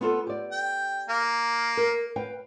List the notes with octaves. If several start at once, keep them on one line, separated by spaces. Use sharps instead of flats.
B3 F4 A4
G4 D5
G5
A#3
A#4
B4 F5 G5